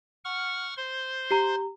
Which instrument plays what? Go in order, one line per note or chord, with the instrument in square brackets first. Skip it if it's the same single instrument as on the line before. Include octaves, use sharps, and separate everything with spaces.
[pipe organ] F#5 C#6 F6
C5 C6
[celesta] G4 A#5